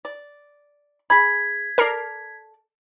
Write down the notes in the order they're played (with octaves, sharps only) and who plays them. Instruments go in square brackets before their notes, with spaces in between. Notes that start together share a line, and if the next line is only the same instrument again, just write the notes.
[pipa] D5
[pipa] G#4 B5 [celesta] G#6 B6
[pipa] A4 D5 [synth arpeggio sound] A#4 A#5 C7